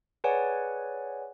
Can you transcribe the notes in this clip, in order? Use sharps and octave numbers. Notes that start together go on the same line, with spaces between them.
G#4 B4 C#5 D5 F#5 G#5